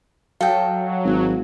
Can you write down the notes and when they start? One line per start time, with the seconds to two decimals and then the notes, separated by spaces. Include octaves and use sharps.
0.41 F#3 A4 D#5 F5 G5
1.04 G#1